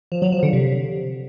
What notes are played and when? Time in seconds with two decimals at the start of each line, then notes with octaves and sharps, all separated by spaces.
0.12 F3
0.22 F#3
0.32 F3
0.43 D3
0.53 C3